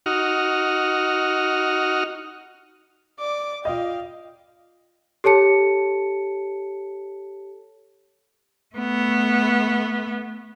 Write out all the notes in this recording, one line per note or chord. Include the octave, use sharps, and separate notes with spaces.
D#4 F#4 F6
D5 D6
F4 D#5 F5 G5
G4 A4 C#5 A5 C#7
A3 B3